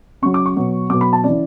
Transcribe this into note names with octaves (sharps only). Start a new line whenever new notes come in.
C#3 F#3 C#6
D6
C#6
B2 F#3
B2 F#3 D6
B5
A5
C#3 E3 D5